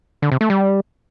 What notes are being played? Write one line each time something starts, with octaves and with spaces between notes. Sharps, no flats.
D3
C3
A3
G3